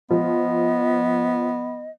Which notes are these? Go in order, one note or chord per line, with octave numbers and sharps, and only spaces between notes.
F3 B3 D#5